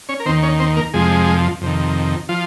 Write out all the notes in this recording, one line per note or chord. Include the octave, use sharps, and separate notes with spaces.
C#4 C#5
A#4
D#2 D#3 C4 C5
C#4 C#5
C4 C5
A#3 A#4
F2 C3 F3 G#3 G#4
F2 C3 D#3
F3 F4